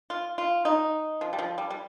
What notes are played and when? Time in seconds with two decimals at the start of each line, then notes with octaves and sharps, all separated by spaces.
0.10 F4
0.38 F4
0.65 D#4
1.21 F3
1.33 G3
1.39 F3
1.58 G3
1.70 G3